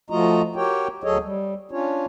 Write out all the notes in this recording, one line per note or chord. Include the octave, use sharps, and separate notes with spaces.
F3 A3 F4 F#4 D#5 A#5
F#4 G4 A#4 C#5 G5
D2 F#3 G#4 A4 C#5 D#5
G3
C#4 D4 F4 C#5